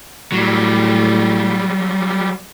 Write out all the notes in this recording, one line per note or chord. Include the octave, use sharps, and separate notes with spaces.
A2 F#3 G3